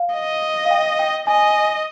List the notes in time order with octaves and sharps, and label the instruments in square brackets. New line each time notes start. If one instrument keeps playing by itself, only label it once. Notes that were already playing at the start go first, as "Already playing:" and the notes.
Already playing: [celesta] F5
[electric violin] D#5
[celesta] F5
G5
G5
[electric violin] D#5 [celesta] G#5